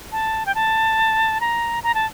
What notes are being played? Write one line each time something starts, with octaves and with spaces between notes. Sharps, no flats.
A5
G5
A5
A#5
A#5
A5